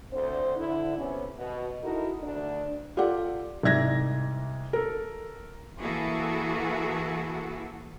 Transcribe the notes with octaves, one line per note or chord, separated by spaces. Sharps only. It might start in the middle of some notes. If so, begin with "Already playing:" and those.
D2 D3 C4 C5
D3 E4
C3 B3 C#4
B2
D#4 E4 F#4 A4 A#4
D2 D4
F4 G4 A4 D5 F#5
C2 G#2 E5 G#6 A#6
A4 A#4
E3 A#3 E4 F#4 G#4 A4